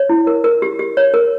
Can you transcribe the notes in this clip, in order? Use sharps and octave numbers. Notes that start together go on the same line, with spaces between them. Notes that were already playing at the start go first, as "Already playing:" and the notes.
Already playing: C#5
E4
A#4
A#4
G4
G4
C#5
A#4